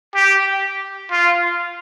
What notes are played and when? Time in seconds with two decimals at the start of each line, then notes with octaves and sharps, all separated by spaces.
0.15 G4
1.11 F4